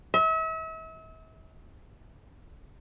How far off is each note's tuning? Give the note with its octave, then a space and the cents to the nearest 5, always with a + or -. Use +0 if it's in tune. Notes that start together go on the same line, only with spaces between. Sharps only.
E5 -40